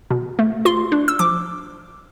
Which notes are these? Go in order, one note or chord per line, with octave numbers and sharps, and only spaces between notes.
B2
A3
F4 C6
D4
E6
F3 D6